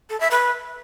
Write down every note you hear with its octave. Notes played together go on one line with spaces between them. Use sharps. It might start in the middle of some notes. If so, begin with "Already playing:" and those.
A4
E5
B4